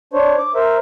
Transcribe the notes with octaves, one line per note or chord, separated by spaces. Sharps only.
D4 C5 C#5
D6
A#4 C5 E5